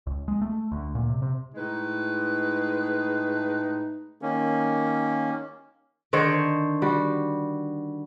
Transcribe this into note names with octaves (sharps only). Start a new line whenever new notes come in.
C#2
G#3
A3
D2
A#2
C3
C3
A2 G#3 D#4 B4
D#3 A#3 C#4
D3 D#3 C5 C#5
G3 F#4